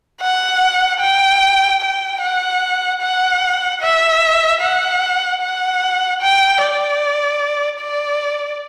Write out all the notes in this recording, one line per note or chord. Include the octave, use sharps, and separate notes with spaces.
F#5
G5
G5
F#5
F#5
E5
F#5
F#5
G5
D5
D5